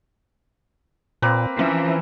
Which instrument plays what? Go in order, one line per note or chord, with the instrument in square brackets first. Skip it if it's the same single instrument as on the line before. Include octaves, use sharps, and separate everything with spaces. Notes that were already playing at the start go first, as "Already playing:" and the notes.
[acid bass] A#2 [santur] A#3 C4 B4
[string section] E3 F3 [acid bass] C#4